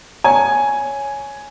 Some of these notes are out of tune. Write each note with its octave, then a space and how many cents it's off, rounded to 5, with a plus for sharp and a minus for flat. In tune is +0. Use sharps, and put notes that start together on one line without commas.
C#5 +0 G#5 +5